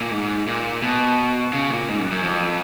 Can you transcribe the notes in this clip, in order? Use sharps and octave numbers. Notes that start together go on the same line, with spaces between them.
A#2
G#2
A#2
B2
C#3
A#2
G#2
F#2
F#2
F2